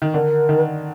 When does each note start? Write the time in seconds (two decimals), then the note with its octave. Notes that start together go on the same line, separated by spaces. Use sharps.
0.02 D#3
0.14 D3 A#4
0.49 D#3